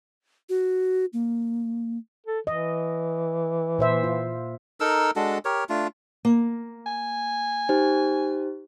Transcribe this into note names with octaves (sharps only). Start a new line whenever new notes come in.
F#4
A#3
A4
E3 D#5
A#2 C5 E5
F4
D#4 A4 A#4 E6
G#3 D4 F#4 A4
G4 A#4 C#5
A3 D4 F4
A#3
G#5
D#4 G4 C5